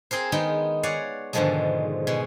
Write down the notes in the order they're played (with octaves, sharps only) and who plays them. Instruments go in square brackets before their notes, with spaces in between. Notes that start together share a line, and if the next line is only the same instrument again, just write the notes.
[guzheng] C4 G#4 A#4 C5
D#3 G#3 B3 D#4 G5
C#5 D5 F5 F#5 G#5
G#2 B2 D3 D#3 F3 G#3
B2 G#3